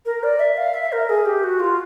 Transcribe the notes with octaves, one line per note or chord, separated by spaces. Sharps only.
A#4
D5
E5
F5
E5
A#4
G#4
G4
F#4
F4